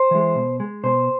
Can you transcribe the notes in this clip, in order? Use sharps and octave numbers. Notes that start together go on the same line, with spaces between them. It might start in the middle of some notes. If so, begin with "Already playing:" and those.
Already playing: C5
E3 G#3
B2
G#3
B2 C5